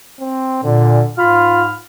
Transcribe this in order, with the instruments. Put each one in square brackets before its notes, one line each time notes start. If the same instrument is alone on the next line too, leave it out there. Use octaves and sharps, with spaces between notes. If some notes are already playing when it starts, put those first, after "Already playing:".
[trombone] C4
[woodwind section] A#2 [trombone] D3
[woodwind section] G#2 B5 F6 [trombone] F4